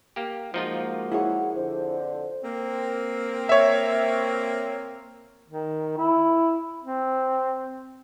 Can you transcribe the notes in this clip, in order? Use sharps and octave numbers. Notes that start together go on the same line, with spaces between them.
A#3 G4
F3 G#3 A#3 D#4 F4 F#4
E4 G#4 C#5 F#5
F2 D3 C5
A#3 C4
C#5 E5
D#3
E4
C4